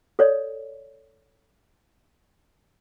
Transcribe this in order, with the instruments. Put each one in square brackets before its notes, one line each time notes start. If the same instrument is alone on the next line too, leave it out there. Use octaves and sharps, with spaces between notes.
[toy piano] A4 C#5 D5